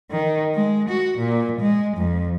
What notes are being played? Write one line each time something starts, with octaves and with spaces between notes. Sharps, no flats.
D#3
G#3
F#4
A#2
G#3
F2